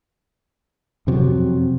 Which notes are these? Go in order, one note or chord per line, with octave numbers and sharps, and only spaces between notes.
F2 C3 F#3